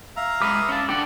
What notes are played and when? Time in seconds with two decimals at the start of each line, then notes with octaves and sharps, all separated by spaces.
0.16 E5 F5 A#5
0.42 G#3 B4 D6 D#6
0.69 C#4 A5
0.89 D4 A4 D5 F#5 G5 D6